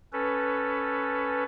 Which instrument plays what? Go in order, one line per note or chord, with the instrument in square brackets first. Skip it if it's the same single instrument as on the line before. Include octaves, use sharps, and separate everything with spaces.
[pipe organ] C#4 A4 B4